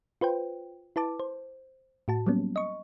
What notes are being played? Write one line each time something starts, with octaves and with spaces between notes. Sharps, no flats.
F4 B4 C5 G5
E4 B4 A5 D6
C5
A2 F#4 A5
F#3 G3 A#3 B3 C#4
D#5 C#6